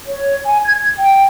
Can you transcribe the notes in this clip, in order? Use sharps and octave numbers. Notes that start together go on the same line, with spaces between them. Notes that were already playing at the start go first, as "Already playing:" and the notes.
C#5
G#5
G#6
G5